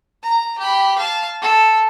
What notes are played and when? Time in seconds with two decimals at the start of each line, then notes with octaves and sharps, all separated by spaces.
0.23 A#5
0.59 G4 B5
0.98 F5 A5
1.41 A4